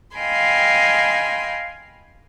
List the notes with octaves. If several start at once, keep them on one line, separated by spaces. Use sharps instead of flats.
D#5 F5 G5 G#5 B5 C6